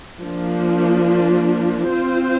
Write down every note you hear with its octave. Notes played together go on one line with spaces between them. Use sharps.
F3 A#3 D4
C4 F4 C5